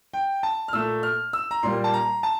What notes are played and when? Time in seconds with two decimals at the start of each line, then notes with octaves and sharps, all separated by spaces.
0.14 G5
0.43 A5
0.68 F6
0.73 A#2 A3 E6
1.03 F6
1.33 E6
1.51 A#5
1.63 A#2 G3 A#3 C6
1.84 A5
1.94 A#5
2.23 A5